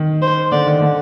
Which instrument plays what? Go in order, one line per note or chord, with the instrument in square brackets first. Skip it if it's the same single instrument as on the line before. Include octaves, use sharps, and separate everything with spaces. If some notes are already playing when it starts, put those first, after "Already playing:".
Already playing: [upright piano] D#3
[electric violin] C5
[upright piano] D3 [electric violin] D5
[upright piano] D#3
D3